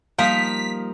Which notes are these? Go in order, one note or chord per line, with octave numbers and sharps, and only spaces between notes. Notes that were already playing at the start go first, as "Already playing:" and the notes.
F3 G3 A#3 D#4 A#4 F5 B6